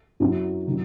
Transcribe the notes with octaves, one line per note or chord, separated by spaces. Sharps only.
F#2 F#3 E4
D#3 F#3